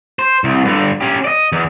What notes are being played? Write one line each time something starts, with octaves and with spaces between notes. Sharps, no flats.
C5
C2
G2 D3
C#4 G4
D5 D#5
E2